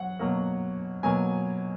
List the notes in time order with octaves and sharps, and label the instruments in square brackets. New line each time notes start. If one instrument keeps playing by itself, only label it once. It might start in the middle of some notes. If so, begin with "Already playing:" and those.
Already playing: [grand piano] F#3 F#5
B2 F#3 A#3
B2 F#3 A#3 G#5